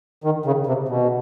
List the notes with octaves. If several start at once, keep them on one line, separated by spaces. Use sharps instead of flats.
D#3
C#3
C3
B2